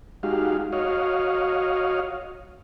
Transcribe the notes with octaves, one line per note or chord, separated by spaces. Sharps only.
G#3 D#4 F#4 G4 F5
F#4 C#5 D#5 F5